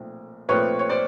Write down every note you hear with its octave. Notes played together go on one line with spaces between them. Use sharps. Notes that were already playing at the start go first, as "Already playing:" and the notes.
Already playing: B1 A#2 F3 A3 C4
B1 A#2 F3 A3 C4 B4 C#5
C#5
C5 D5